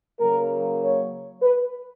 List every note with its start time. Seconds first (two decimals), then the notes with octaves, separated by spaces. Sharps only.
0.19 C#3 F#3 A#3 A#4
0.81 C#5
1.42 B4